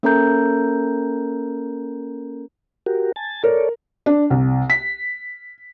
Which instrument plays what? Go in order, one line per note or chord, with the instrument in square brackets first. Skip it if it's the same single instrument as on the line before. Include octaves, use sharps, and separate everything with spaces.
[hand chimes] A#3 C#4 A4 A#4 A#5 G6
[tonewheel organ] F#4 G4 A#4
G#5 A5 A6
[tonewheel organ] A4 C#5 D5 [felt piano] A#4
[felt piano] D4
C2
B6